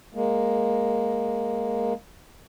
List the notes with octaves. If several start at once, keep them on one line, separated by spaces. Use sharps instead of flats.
G#3 A#3